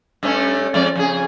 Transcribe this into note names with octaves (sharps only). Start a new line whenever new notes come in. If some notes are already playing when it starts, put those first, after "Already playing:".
G2 A3 C#4
F2 G#3 D5
F2 C#3 G#4